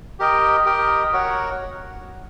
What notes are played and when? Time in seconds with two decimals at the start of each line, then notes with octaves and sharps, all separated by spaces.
0.19 G4 A#4 D#5 G5
0.66 G4 A#4 D#5 G5
1.13 F#4 A#4 C#5 F#5